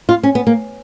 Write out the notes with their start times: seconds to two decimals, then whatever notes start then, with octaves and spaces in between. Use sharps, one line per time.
0.09 F4
0.23 C#4
0.35 B3
0.47 A#3